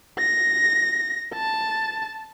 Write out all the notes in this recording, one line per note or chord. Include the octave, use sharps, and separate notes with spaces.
A#6
A5